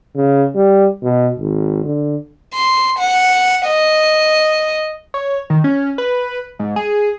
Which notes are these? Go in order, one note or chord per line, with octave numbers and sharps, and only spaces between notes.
C#3
G3
B2
G#1
D3
C6
F#5
D#5
C#5
D#3
C#4
B4
G#2
G#4